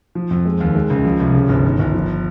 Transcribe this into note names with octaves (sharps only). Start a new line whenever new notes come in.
F3
F2
G#3
D#2
G#3
C#2
F3
C2
C#3
G1
D#3
G1
F3